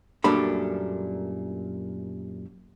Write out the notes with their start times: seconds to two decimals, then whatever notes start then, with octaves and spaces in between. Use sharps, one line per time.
0.24 F#2 A#2 G3 A3 D4 B5